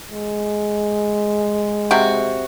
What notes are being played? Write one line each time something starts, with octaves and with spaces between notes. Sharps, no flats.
G#3
C3 F#4